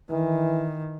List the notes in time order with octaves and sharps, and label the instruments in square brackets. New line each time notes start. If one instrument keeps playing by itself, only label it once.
[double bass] D#3 [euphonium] E3